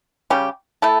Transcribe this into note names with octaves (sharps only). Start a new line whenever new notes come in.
C#3 G3 C#4 G4
A3 E4 A4